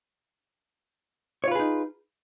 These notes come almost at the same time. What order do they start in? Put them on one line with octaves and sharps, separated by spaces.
C#5 F4 B4 G#4 D#4